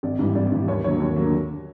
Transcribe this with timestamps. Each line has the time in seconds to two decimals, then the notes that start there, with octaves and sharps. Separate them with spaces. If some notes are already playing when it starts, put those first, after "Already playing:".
0.03 G#1 D5
0.19 G#2 E3 G3
0.35 G#1 D5
0.52 G#2 E3 G3
0.68 D#2 C#5
0.84 D3 F#3 A#3 C#5
1.00 D#2
1.16 D3 F#3 A#3